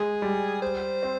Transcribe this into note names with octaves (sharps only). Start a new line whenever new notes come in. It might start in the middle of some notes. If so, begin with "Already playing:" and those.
Already playing: G#3 G#4
G3
C5
C4